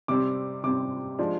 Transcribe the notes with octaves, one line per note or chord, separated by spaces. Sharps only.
C3 G3 C4 D6
C3 G3 C4 D6
F3 G#3 D4